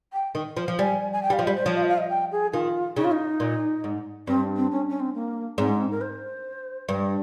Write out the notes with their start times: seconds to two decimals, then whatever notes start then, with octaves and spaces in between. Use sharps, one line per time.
0.13 G5
0.35 D#3
0.57 F3
0.68 F3
0.79 G3 G#5
1.13 G#5
1.22 G5
1.30 G3 F5
1.39 F3
1.44 D#5
1.47 G3
1.55 C5
1.66 F3 C#5
1.77 F5
1.83 D#5
1.88 F5
1.98 D#5
2.10 G5
2.32 G#4
2.53 D#3 F4
2.96 C#3 D#4
3.04 F4
3.12 D#4
3.40 A#2
3.84 G#2
4.27 G2 C4
4.56 C4
4.71 C#4
4.89 C#4
5.00 C4
5.14 A#3
5.58 G#2 C4
5.69 C#4
5.79 C4
5.91 A#4
6.01 C5
6.89 G2